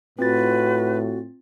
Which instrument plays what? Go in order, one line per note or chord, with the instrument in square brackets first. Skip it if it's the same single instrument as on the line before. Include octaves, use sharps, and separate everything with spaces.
[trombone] A2 [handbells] C4 F4 A6 [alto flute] F#4 [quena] B4